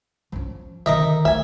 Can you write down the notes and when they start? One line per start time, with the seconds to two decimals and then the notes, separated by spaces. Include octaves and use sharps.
0.32 F3 C#4
0.86 D3 D#3 D#4 D#5 E5
1.25 A3 E5 G#5